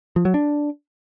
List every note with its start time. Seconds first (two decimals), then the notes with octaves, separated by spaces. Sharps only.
0.16 F3
0.25 F#3
0.34 D4